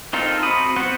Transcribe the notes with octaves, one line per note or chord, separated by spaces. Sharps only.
C4 D#4 F4 A4 A#4
C4 F#4 B5 D#6
B3 C4 F4 C5 F#5